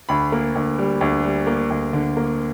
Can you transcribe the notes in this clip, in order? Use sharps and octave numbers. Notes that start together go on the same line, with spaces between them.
D2 B5
A#3
D2
G3
D2
G3
A#3
D2
D3
A#3